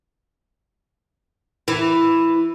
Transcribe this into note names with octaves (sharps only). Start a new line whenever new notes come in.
E3